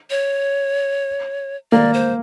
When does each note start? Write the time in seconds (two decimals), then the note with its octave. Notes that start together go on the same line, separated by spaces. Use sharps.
0.10 C#5
1.72 A#3 D5
1.94 C5